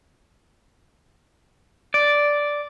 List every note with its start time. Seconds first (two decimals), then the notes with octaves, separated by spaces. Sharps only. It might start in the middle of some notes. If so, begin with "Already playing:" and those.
1.94 D5